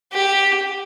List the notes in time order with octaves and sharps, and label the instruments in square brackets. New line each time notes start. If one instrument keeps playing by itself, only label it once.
[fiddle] G4